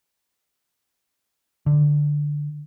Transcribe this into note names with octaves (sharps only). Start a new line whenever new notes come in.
D3